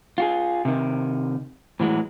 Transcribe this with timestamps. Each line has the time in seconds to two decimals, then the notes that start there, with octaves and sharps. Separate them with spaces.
0.18 F4 F#4 G#4
0.65 C3 D#3
1.80 A2 E3 F#3 G#3